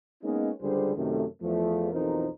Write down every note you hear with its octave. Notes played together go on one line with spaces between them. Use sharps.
G#3 A#3 B3 C#4 D#4
C#2 D3 G3 G#4 C5
F#2 C3 D#3 A3
E2 F3 A3
B1 F2 E3 D#4 A#4 C5